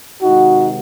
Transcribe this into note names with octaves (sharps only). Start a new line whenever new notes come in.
C3 D#3 G#3 D#4 F#4